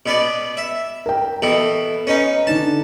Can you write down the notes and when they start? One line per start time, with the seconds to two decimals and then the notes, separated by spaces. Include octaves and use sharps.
0.06 B2 B3 D5
0.57 E5
1.06 A#4 G5
1.42 B2 E3 A4
2.07 C#4 D#4 B4
2.47 D3 D4 D#4 A5